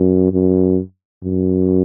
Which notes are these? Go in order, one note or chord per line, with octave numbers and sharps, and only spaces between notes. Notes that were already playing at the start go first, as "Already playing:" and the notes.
Already playing: F#2
F#2
F#2